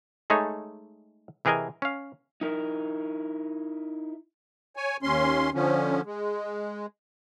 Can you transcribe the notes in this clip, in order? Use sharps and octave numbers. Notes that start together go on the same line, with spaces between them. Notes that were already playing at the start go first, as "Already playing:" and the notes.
G#3 A3 D#4 G#4 A4 C#5
C3 E3 G#4 A#4 D#5 G#5
C#4 F5
D#4 E4 A#4
C#5 G#5
D#2 C#4 C6
D3 F3 C#4
G#3